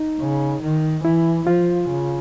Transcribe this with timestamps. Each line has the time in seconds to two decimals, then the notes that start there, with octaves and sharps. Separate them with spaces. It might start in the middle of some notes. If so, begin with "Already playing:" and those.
Already playing: D#4
0.19 C#3
0.62 D#3
1.04 E3 E4
1.47 F3 F4
1.89 C#3